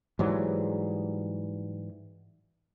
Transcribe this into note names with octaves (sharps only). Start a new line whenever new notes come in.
G#2 E3 F#3 G3